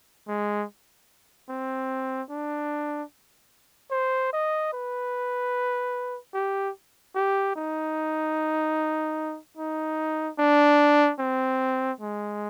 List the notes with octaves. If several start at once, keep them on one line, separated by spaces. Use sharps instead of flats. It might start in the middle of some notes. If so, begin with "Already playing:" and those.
G#3
C4
D4
C5
D#5
B4
G4
G4
D#4
D#4
D4
C4
G#3